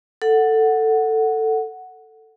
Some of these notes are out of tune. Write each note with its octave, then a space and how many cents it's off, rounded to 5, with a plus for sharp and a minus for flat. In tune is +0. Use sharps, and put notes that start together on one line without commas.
A4 +10 F#5 +0